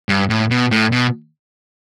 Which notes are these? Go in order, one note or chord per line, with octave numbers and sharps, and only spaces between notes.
G2
A2
B2
A2
B2